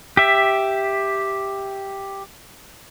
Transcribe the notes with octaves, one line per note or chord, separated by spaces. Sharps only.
G4 E5